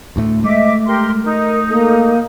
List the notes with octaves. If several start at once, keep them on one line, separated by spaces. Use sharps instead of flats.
D2 A2 A3
G#3 A3 D#5 E5 D6
G4 A#4 C6
D#4 A#4
A#3 A4